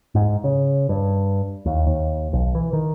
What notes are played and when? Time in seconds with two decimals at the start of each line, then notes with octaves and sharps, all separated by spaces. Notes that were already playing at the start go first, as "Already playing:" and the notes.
0.15 G#2
0.44 C#3
0.89 G2
1.66 D#2
1.87 D#2
2.33 B1
2.55 E3
2.73 D#3